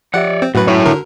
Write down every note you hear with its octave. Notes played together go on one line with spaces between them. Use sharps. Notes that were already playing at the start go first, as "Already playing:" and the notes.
F3 G4 C#5 D5 E5 F#5
C4
F#2 A2 F#4 B4
E4 C#5
D3 A#4